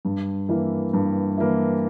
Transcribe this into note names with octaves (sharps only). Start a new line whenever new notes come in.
G2
E3 A#3 E4
G2
E3 A#3 E4